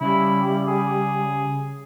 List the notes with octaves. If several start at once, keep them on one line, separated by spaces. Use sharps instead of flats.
C#3 G3 E4
G#4